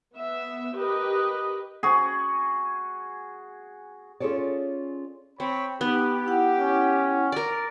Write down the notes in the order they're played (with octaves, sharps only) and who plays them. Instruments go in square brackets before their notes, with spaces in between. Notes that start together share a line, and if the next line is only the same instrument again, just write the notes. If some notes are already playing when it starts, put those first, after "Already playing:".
[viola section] B3 E5
G4 A#4 B4 D#5
[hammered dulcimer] F#4 G#4
[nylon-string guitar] C#4 F4 G#4 A4 C#5 D5
[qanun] C4 [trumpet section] C#5 G5 B5
[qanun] B3 [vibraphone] D#4 [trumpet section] G4
[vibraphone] E4 F#5 G5
[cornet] C#4
[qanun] A#4 D5